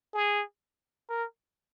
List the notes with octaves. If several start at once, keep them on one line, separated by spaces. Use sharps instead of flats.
G#4
A#4